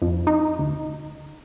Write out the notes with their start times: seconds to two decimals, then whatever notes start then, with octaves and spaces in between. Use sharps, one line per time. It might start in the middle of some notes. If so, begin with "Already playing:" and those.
0.02 F2
0.27 D#4
0.59 D2